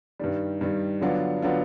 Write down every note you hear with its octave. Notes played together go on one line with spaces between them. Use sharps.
G2 D#3 G3
G2 D#3 G3
D3 F#3 B3 D4 F4
D3 F#3 B3 D4 F4